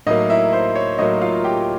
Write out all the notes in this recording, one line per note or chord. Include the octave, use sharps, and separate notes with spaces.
A2 F#3 A#3 D#4 D#5
E4 E5
C5
C#5
A2 F#3 A#3 D#4 D#5
F4 F5
G4 G5